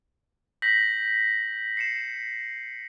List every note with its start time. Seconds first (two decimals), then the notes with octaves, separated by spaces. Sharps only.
0.62 G6 A#6 B6 F#7
1.77 C7 C#7 E7